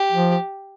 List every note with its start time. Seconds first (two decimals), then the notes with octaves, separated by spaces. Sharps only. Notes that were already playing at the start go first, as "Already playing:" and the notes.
Already playing: G4
0.12 F3